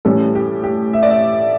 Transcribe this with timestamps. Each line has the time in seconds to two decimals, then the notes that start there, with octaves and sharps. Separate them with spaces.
0.05 A2 E3 G3 C#4 A4
0.35 G4
0.64 G4
0.93 E5
1.03 D5
1.11 E5